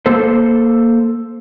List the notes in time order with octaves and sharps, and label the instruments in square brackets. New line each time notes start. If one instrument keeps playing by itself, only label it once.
[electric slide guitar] A#3 A4 C5